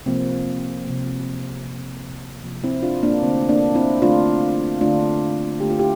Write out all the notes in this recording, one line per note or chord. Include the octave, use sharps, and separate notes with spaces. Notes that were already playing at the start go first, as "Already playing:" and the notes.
C3 F3 A#3 C4
C3 F3 A#3
C3 F3 A#3
C3 F3 A#3
C4 E4
D4 F4
A#3 D4
D3 A3 C4
A#3 D4
C4 E4
D3 A3 D4 F4
D3 A3 D4 F4
D3 A3 G4
F4
E4 G4